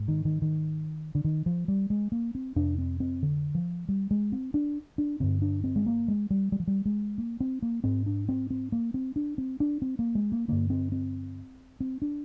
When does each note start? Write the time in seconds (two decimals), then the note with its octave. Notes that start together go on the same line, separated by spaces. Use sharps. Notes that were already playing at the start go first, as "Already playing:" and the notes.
Already playing: G#2
0.08 D#3
0.25 D#3
0.42 D#3
1.15 D3
1.24 D#3
1.46 F3
1.68 G3
1.90 G#3
2.12 A#3
2.35 C4
2.56 F2 C3 D4
2.78 C4
3.00 C4
3.23 D3
3.55 F3
3.89 G3
4.11 G#3
4.32 C4
4.54 D4
4.98 D4
5.20 G2 D3 C4
5.42 D4
5.64 C4
5.76 G#3
5.86 A#3
6.08 G#3
6.30 G3
6.52 G3
6.60 F3
6.67 G3
6.86 G#3
7.18 A#3
7.40 C4
7.62 A#3
7.84 G#2 C4
8.06 D4
8.29 C4
8.50 C4
8.72 A#3
8.94 C4
9.16 D4
9.38 C4
9.60 D4
9.82 C4
9.99 A#3
10.15 G#3
10.32 A#3
10.48 G2 D3 A#3
10.70 C4
10.92 C4
11.80 C4
12.02 D4